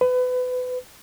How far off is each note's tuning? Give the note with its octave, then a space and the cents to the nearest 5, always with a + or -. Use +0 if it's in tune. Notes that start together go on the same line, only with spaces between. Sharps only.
B4 +30